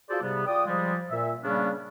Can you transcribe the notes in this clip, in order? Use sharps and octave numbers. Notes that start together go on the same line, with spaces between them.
F4 F#4 G#4 A4 C5 D5
G#2 C3 G3 B3
F4 D5 G5 D#6
F3 G3 G#3
A#2 E5
C#3 G3 A#3 B3 C#4 D4